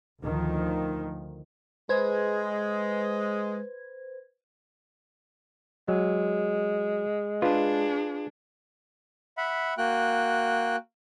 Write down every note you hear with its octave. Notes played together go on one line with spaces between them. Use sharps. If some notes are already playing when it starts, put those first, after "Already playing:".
D2 D#3 F3
G#3 B4 C5 G#6
F#3 G#3
D4 F4 G#4 B4
E5 F#5 B5
A#3 F#4 G5 F#6